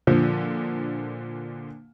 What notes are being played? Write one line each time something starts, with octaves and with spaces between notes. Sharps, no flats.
A#2 D3 F3